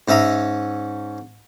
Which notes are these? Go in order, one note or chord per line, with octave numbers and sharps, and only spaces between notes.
G#2 C#4 E5 A#5 D#6